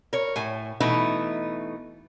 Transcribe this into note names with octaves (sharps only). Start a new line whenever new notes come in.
A#4 C#5
A2 G#5
B2 E3 A3 D#4